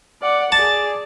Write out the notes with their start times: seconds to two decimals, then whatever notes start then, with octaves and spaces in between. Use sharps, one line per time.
0.22 D5 F#5
0.52 G#4 D5 A5